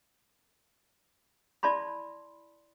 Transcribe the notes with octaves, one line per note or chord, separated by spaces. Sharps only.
E4 D5 A5 B5 C6